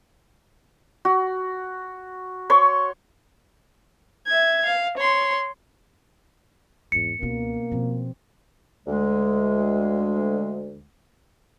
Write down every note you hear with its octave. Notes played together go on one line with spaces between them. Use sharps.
F#4
C#5 C6 C#6
E5 G#6
F5
C#5 C6
G#1 E2 G#2 C#7
C#2 B2 A#3 B3 C#4 F4
B2 F3 C4
D2 G#3